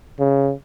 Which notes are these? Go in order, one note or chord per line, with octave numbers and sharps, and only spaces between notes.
C#3